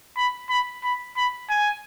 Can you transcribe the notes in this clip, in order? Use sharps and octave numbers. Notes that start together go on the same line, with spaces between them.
B5
B5
B5
B5
G#5